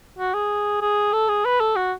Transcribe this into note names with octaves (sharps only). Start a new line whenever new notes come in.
F#4
G#4
G#4
A4
G#4
B4
A4
F#4